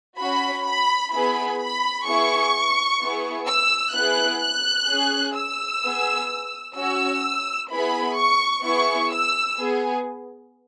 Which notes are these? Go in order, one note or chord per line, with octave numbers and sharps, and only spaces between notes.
C#4 F#4 B5
B5
B3 E4 G#4 B5
B5
B3 E4 G#4 C#6
B3 E4 G#4
E6
B3 E4 G#4 F#6
F#6
C#4 G#4
E6
B3 G#4
C#4 F#4 E6
B3 E4 G#4 B5
C#6
B3 E4 G#4 C#6
E6
B3 G#4